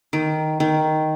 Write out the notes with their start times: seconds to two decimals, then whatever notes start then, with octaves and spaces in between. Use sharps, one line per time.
0.13 D#3
0.60 D#3